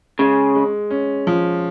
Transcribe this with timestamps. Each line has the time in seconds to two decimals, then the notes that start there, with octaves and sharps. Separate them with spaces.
0.19 C#3 G#3
0.55 G#3
0.90 C#4
1.27 F3